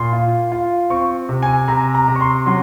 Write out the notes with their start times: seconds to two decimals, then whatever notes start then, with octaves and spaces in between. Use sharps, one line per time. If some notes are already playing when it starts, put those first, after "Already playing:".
Already playing: A#2 C6
0.13 F4
0.52 F4
0.90 C4 C#6
1.29 C3
1.43 G#5
1.68 C3 A#5
1.95 A#5
2.08 C3
2.16 C#6
2.21 C6
2.46 F#3 C6